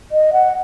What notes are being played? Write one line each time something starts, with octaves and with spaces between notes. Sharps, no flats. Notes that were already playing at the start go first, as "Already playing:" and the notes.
D#5
F#5